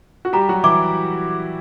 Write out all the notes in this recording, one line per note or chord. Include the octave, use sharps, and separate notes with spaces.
F#4
G3 G4 A#5
F#3 F#4
E3 E4 D6